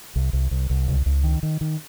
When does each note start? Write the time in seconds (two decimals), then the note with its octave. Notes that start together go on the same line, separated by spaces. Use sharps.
0.16 C2
0.33 C2
0.51 C2
0.70 C2
0.88 C#2
1.06 C#2
1.23 D#3
1.43 D#3
1.61 D#3